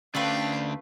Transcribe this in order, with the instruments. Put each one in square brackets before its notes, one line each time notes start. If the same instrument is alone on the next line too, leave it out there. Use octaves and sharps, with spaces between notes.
[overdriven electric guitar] D2 D4 [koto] A3 F4 B4 [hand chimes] C#4 [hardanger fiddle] F5 G5